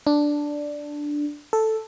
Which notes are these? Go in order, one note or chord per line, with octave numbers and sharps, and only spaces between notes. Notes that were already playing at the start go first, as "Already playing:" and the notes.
D4
A4